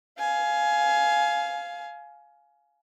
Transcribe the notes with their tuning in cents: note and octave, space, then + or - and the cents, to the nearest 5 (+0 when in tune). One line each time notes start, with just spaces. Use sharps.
F5 +0 G#5 +20